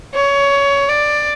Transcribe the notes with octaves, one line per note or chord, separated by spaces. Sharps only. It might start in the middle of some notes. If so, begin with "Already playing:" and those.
C#5
D5